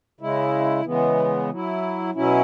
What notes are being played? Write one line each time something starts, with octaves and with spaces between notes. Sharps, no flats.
C#3 G#3 E4
C#3 E3 G#3 B3
F#3 E4
B2 F#3 C#4 E4